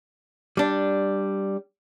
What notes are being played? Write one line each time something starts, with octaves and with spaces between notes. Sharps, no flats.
G3 D4